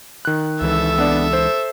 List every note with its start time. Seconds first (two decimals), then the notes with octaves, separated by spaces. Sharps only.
0.25 D#3 F#6
0.61 C#2 E3 A4 E5
0.98 B3 D4 D5
1.33 C5